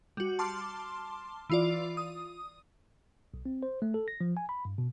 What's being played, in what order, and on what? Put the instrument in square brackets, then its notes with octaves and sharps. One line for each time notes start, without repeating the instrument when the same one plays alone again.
[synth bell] G3 F#4
A5 C6 D6 F6
E3 F4 D5
D#6
[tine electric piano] B1
C4
C5
A3
A4
A#6
F3
G#5
B5
G2
B2